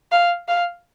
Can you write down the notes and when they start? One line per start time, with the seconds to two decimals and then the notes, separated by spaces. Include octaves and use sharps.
0.12 F5
0.48 F5